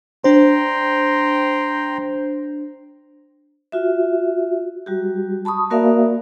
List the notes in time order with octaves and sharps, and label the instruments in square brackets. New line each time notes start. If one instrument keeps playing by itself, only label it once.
[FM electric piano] D4 C5 [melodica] G5 A#5 C6
[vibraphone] F4 F#4 E5
G3 F#4 G4
A5 B5 C#6 D#6
A#3 F#4 A#4 D5 E5 F5